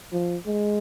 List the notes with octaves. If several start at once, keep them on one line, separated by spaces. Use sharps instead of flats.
F3
G#3